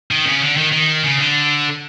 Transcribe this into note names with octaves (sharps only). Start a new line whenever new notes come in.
D#3
C#3
D3
D#3
D#3
C#3
D3